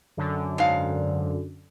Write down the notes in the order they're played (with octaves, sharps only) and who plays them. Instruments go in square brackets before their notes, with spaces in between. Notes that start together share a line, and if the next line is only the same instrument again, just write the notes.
[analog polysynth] F#2 D3
[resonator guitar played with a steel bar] G#2 F5